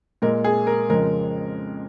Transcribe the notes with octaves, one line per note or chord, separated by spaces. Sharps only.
A#2 G#3 A#4
G#4
A#4
F2 C#3 F3 G#3 A#4